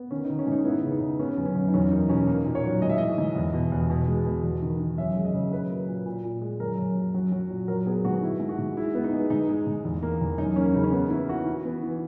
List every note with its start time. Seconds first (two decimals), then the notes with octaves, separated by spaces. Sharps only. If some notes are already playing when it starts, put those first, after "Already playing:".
Already playing: B3
0.11 D#3 C#4
0.25 D#4
0.30 D#3
0.39 C#4
0.47 G#2
0.52 D#4
0.65 B3 E4
0.84 C#3
0.92 D#4
1.01 C#3
1.19 B3 C#4
1.37 F#2
1.46 C#4
1.56 F#2
1.68 D#4
1.74 E2 C#4
1.91 A#3 D#4
2.09 B2 C#4
2.27 A#3 D#4
2.45 A#2
2.55 C#5
2.64 F#3
2.82 G#2 D#5
2.90 E5
2.98 E3 D#5
3.18 G#2
3.35 E2
3.54 B2
3.72 E2
3.90 B2
4.08 G#3
4.25 B2
4.44 E2
4.62 D#3
4.80 D#3
4.98 F#2 E5
5.16 G#3
5.25 D#5
5.34 C#3
5.51 F#3 B4
5.70 A#3
5.88 A#2
6.06 A#2
6.24 A#2
6.41 G#3
6.60 F#2 A#4
6.78 F#2
6.97 F#2
7.14 F#3
7.32 F#3
7.50 A#2
7.68 F#3 A#4
7.86 B3 G#4
8.05 G#2 F#4
8.22 G#2 E4
8.40 G#2
8.49 F#4
8.59 G#2
8.77 G#3 E4
8.95 B3
9.04 D#4
9.13 G#3
9.30 G#2 D#4
9.49 G#3
9.67 G#2
9.85 E2
10.03 A#3
10.21 E2
10.38 F#2 D#4
10.56 A#3 C#4
10.74 C#3 D#4
10.84 C#4
10.93 B3 D#4
11.10 E3 E4
11.29 E3 F#4
11.46 E3
11.65 B3
11.83 E3